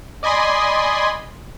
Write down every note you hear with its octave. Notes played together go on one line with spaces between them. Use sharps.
D5 D#5 G#5 B5 C6